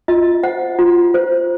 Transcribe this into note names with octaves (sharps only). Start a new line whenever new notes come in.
F4 D#5
C5 F#5
F4
C5